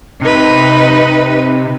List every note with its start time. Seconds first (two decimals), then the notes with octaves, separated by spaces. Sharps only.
0.21 C3 D#4 B4